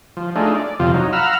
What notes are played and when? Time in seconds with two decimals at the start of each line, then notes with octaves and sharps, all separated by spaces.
0.17 F3
0.36 A3 D4 D#4 F4 G#4
0.54 D5
0.80 F2 C3 F3 F4
0.94 F#3 D#4
1.13 F5 F#5 A#5 B5 E6 F6